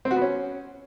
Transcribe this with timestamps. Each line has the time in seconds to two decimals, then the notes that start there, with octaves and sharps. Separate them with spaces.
0.05 C4
0.11 F#4
0.16 B3
0.22 C#4